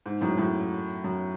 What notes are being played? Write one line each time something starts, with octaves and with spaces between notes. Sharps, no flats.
G#2
F#2 A2
F#2 A2
F#2